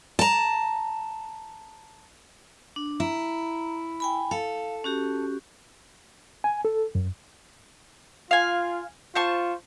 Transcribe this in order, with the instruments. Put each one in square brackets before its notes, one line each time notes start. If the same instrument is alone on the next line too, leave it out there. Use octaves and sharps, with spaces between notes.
[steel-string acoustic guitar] A5 A#5
[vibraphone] D4
[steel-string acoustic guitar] E4 [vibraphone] A#5
[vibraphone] G5 G#5 B5
[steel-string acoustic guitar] A4 [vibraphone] F5
[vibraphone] C#4 F#4 G4
[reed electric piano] G#5
A4
F#2
[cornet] F4 [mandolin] F5 G#5
[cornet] F4 [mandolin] C5 A5 C#6